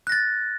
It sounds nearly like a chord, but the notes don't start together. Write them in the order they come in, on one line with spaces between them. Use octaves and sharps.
F#6 A#6 A6